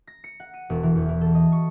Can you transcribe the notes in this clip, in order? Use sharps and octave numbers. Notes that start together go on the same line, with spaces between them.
A#6
C#7
F#5
D#7
E1
E3
E2
E3
A4
D#5
C#6